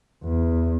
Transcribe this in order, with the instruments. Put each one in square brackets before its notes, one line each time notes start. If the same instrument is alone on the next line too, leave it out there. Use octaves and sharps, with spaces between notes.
[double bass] E2